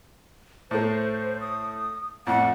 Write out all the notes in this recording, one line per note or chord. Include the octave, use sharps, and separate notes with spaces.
A2 A3 C5
D#6
F2 A2 F#5